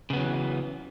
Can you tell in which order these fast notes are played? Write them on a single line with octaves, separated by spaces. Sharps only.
C#3 B3 F#3 E3